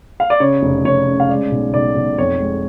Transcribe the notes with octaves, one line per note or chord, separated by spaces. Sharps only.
F5
D5
C#3 C#5
F1
F1 C#5
C#3
F5
G#3 D5
B1
B1 D5
B1
F2 C#5
G#3